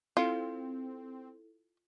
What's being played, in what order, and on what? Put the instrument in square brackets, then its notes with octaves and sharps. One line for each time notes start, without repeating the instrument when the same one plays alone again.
[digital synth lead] C4 [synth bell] E4 A4 [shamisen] F4